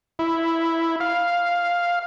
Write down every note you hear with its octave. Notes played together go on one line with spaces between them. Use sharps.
E4
F5